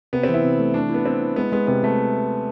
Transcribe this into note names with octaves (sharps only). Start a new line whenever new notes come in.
C3 B3
C4
E3
E4
C3
A3
A3 D4
B3 E4
C4 E4
E4
G#3 B3
G#3 B3
C3 B3
C3 A3